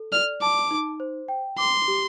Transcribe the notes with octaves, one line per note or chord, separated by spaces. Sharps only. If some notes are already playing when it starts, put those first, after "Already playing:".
Already playing: A4
D5 F6
A5 D6
D#4
C5
G5
C6 D6
G4